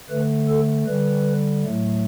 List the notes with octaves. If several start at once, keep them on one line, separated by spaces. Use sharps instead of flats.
D3 A3 B4
A4
D3 G3 B4
A2 F#3 A3